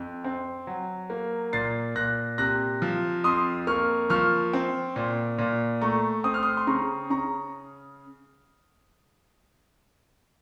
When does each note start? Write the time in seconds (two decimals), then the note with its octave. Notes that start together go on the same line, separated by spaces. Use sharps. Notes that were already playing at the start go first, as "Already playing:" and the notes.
Already playing: F2
0.24 C4
0.67 F#3
1.10 A#3
1.53 A#2 A6 C7
1.95 A#2 F#6 A#6
2.38 C3 F#6 A#6
2.82 F3
3.24 F2 C6 D#6
3.67 A#3 C#6 F6
4.10 F3 C#6 F6
4.53 C4
4.96 A#2
5.38 A#2
5.81 A3 A#5 C#6
6.24 C4 D#6
6.34 F6
6.43 C6 D#6
6.57 C6
6.67 C#3 A#5 C#6
7.10 C#3 A#5 C#6